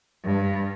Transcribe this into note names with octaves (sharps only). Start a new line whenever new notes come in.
G2